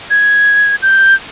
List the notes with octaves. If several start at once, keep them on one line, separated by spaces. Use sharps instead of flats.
G#6
G6